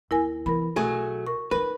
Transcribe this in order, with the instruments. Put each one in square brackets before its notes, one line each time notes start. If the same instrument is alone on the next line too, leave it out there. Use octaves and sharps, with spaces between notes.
[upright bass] D#2 [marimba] E4 A#4 G#5
[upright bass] E3 B3 [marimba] A#4 B5
[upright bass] B1 [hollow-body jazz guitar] F#3 A3 G#4
[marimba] A#4 C#6
[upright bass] C#4 D#4 [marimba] A#4 [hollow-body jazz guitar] B4